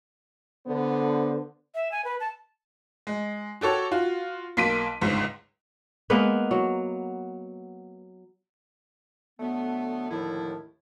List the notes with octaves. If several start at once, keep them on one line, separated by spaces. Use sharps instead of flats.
D3 B3 C5
E5
G#5
B4
A5
G#3
F#4 G4 A4 C#5
F4 F#4
B1 A#3 C6 B6 D7 D#7
G1 C#2 G#2
G#3 A#3 B3 B4
F#3
D3 F#3 A3 B3
D#2 A2 D3 D#3 F3 E4